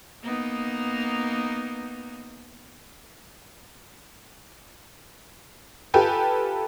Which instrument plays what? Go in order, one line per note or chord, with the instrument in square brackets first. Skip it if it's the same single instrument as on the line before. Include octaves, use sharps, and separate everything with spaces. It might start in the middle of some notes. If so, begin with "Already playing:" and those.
[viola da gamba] A#3 B3 D#4
[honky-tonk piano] F4 G4 A4 B4 G5 G#5